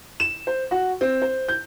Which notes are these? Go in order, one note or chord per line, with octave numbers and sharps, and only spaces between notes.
E7
C5
F#4
C4
C5
G6